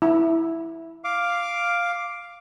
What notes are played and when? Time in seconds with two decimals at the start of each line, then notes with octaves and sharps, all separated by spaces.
0.02 E4
1.04 F5 D6